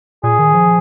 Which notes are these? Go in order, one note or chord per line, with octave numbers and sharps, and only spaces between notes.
A#2 G#4
D#3
F3